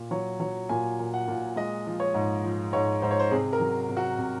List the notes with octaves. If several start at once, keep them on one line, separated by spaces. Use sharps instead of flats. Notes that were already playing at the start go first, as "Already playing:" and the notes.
Already playing: A#2
F#3 C#5
F#3 C#5
A#2 G#5
A#2
F#5
A#2
G#3 D#5
F3
C#5
G#2
F3
G#2 C#5
G#2 C5
C#5
C5
C3 G#4
A#4
F#3
C3
F#4
C3